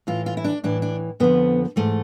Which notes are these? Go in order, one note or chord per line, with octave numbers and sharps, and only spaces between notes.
A2 E3 F4
F4
E4
D4
A2 E3 D4
D4
F2 D3 F3 B3
G#2 E3 A3